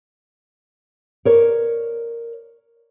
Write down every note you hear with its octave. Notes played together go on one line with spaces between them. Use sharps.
A#4 C#5 D5